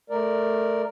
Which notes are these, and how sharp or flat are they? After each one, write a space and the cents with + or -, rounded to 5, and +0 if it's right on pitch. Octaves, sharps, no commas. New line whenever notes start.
A3 +0 A#4 +0 D5 +10